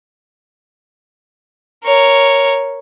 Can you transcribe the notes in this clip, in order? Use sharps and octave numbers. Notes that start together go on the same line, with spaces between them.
A#4 C#5